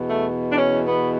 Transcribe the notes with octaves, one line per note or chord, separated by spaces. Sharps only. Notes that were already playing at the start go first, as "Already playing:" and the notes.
Already playing: E2 B2
A3
D4
C#4
B3